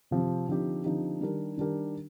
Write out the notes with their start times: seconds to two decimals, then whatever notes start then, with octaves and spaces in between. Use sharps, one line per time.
0.11 C3 F3 C4 G4
0.47 D3 F3 C4 D#4 G4
0.84 D3 F3 C4 D#4 G4
1.21 D#3 G3 D4 G4 A#4
1.57 D#3 G3 D4 G4 A#4